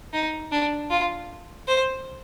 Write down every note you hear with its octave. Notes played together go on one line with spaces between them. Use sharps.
D#4
D4
F4
C5